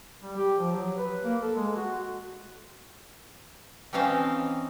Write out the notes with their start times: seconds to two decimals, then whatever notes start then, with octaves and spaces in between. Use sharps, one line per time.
0.22 G3
0.37 G4
0.58 F3
0.71 F#3
0.97 B4
1.24 A#3
1.42 A4
1.56 G#3
1.76 F#4
3.93 E3 C4 C#4 D#4 F5 A5